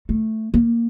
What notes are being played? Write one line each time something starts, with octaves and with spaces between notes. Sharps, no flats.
A3
A#3